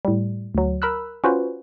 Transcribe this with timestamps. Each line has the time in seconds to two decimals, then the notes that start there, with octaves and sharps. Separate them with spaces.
0.05 A2 G3
0.55 D2 F#3
0.82 A#4 B5 E6 F#6
1.24 C#4 F4 F#4 B4 C5